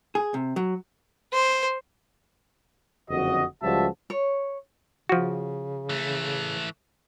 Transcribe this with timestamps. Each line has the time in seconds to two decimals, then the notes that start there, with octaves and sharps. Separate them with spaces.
0.15 G#4
0.34 C3
0.56 F#3
1.33 C5
3.10 F#1 F2 D3 F#4 D#5
3.63 C#2 F3 G3 F#4 E5 A5
4.10 C#5
5.09 C#3 F3 F#4
5.89 E3 A3